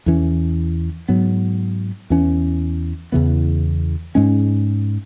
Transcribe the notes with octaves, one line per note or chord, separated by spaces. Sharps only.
E2 E3 C#4
G#2 F#3 B3
E2 E3 C#4
E2 C#3 E3 B3
G#2 G#3 C#4